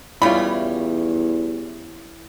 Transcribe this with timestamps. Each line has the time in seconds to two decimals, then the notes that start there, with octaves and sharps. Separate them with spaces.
0.22 E2 C#3 G3 E4 F4 C#5 B5